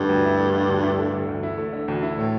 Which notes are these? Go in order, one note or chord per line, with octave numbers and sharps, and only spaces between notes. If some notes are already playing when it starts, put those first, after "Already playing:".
Already playing: G2 D3 A3
D2
E4
A3
D3
D2
E4
A3
D3
D2
E4
A3
D3
D2
E4
A2 A3